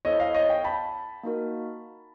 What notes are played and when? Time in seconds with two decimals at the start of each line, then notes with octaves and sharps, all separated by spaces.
0.05 B3 E4 A4 C5 C#5 D#5 E5
0.20 D#5 F5
0.34 C#5 D#5
0.49 F5 G5
0.64 A5 B5
1.23 A#3 D#4 F#4 A#4